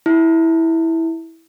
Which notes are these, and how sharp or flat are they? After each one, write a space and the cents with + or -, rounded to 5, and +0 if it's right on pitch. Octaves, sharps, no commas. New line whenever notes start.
E4 -10